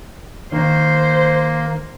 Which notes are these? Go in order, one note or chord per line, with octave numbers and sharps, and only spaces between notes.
D#3 A#3 C5